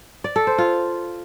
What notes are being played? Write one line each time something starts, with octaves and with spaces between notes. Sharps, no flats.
D5
A4
C5
F4